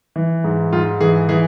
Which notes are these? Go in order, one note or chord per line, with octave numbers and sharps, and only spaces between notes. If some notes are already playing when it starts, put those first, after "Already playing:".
E3
G#2
G#2 F4
E3 G#4
E3 G#4